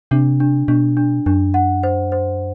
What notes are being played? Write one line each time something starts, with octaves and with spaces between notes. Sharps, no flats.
C3 D4
D4
B2 D4
D4
F#2 D4
F#5
C5
C5